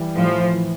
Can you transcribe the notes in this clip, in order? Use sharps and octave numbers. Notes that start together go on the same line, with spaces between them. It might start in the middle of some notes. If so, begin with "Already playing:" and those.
Already playing: E3 G3
A2 F3
E3